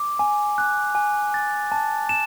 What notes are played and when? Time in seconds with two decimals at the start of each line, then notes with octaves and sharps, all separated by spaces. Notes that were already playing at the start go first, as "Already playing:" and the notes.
Already playing: D6
0.19 G#5
0.58 F#6
0.95 G#5
1.34 A6
1.72 A5
2.09 E7